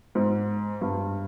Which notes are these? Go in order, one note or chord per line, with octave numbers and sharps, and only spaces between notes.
G#2
G2